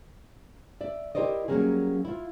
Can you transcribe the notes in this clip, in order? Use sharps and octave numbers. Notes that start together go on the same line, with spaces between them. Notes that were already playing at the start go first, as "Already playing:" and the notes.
D5 E5
E4 G4 A#4 C5 D5 D#5
F#3 G3 A#3 C#4 G#4
E4 F4